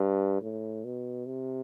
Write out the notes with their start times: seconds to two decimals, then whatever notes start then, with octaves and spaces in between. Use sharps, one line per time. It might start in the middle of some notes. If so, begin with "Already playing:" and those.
Already playing: G2
0.42 A2
0.84 B2
1.26 C3